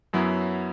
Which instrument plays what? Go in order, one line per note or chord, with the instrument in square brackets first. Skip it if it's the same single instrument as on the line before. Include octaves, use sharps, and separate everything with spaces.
[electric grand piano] F#2 F#3 B3 E4